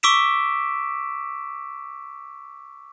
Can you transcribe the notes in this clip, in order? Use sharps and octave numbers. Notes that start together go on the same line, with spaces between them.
C#6 D6 E6 B6 D7 E7